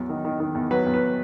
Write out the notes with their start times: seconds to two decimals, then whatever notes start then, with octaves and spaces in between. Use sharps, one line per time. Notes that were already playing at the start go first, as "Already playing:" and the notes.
Already playing: E2 F#3
0.09 D#3
0.25 D#3
0.40 D#3
0.55 E2
0.71 F#3 B4
0.86 E2
0.94 B4